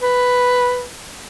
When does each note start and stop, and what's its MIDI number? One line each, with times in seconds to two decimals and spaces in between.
0.02 0.84 71